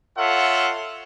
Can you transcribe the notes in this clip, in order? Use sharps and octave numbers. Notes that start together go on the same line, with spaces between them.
F4 A4 C#5 E5 F#5